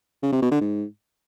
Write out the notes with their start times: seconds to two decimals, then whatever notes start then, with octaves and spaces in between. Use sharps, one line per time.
0.23 C#3
0.32 C3
0.42 B2
0.51 D3
0.61 G#2